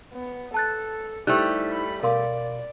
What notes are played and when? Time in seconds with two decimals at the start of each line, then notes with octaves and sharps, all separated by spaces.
0.14 B3
0.54 A4 A5 F#6 A6
1.27 G3 A3 D#4 E4 G4 C5 F#6
1.72 B5
2.03 B2 A#4 D5 F5 C6 D6